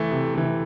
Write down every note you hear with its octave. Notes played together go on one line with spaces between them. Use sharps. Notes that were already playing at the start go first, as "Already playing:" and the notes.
Already playing: E3 A3
C3
E3 A3